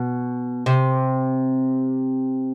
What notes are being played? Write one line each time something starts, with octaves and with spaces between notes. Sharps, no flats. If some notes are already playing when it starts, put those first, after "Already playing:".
Already playing: B2
C3